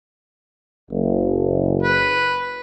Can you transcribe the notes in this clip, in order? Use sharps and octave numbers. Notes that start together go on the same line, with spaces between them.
F#1
B4